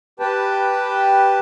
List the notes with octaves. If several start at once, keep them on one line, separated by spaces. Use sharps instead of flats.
G4 B4 G5 A5